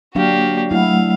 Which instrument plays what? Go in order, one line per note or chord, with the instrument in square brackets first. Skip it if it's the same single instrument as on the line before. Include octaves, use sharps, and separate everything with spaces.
[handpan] F#3 D4 F5 [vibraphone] A#3 [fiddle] F#4 G4
[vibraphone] F#3 A3 F#5 [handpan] E4 [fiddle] F5